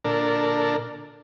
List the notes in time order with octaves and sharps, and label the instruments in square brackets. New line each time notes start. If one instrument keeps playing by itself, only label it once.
[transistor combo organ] A#2 D3 D4 A4 A#4